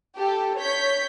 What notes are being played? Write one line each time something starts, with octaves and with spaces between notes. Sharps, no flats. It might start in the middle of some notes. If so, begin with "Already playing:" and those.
G4 A4
C#5 G6 B6